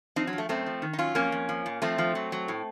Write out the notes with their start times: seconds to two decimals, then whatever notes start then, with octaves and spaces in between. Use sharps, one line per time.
0.16 F3 C4 D#4
0.27 F#3
0.33 F3
0.38 A3
0.49 F#2 A3 C4
0.66 F3
0.82 D#3
0.93 D#4
0.98 F#3 C#4 F4
1.15 F2 A#3 C#4
1.32 F2
1.49 F3
1.66 A#2
1.82 F3 A3 C4
1.98 F3
2.15 F#3
2.32 F#3
2.48 A2